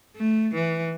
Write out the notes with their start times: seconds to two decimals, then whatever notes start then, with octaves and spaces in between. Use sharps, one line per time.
0.16 A3
0.55 E3